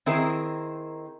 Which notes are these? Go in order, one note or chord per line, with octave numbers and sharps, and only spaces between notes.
D#3 C4 E4 G#4 A#4